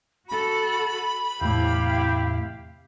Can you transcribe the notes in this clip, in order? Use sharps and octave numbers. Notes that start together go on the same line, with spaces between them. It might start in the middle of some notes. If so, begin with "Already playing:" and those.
F#4 A4 B5
E2 A2 C3 E4 G4 F5